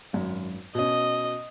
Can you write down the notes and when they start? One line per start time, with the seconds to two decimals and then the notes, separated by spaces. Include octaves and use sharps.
0.13 G#1 F#2
0.75 B2 C#4 D#5